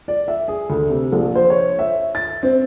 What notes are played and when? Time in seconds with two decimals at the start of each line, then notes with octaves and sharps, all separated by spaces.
0.08 D5
0.28 E5
0.48 G#4
0.70 D2
0.90 C3
1.12 A#1
1.35 C5
1.50 C#5
1.79 E5
2.15 A6
2.43 C4